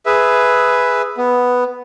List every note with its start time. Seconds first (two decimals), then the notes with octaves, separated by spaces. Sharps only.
0.06 G#4 B4 E5
1.17 B3